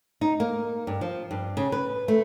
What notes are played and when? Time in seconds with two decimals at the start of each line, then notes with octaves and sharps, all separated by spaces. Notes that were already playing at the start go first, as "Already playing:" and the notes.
0.21 D#4
0.40 A#3
0.87 G2
1.01 F3
1.31 G2
1.57 C#3
1.72 B4
2.08 A3